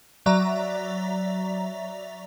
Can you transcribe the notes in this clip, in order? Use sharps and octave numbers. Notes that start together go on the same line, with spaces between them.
F#3 D5 E5 A#5